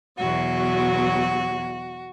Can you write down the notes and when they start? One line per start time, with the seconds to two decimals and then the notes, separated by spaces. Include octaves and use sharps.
0.18 E2 B2 F#3 F#4